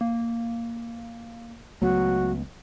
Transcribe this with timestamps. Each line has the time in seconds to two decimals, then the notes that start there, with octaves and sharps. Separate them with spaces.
0.01 A#3
1.82 C#2 F#3 A3 B3 F#4